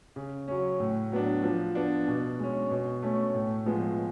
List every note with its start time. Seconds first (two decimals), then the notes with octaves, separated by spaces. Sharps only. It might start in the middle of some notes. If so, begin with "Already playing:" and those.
0.16 C#3
0.48 F#3 C#4
0.80 A2
1.12 F#3 B3 D4
1.43 F3
1.75 B3 D4
2.08 B2
2.39 G#3 C#4
2.71 B2
3.02 A3 C#4
3.34 A2
3.66 F3 G#3 B3